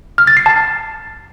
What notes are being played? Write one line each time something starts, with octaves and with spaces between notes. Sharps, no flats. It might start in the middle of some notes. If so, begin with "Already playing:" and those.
F6
A6
C7
A5